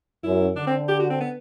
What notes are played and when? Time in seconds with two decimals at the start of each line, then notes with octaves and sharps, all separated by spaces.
0.24 F#2 E4
0.56 D3 D4
0.67 C4
0.88 G4
1.00 F#4
1.10 C4
1.20 B3